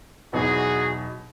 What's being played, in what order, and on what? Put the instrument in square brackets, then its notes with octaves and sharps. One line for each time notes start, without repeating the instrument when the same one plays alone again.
[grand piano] E2 B2 F#3 B3 D#4 [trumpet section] F#4 G#4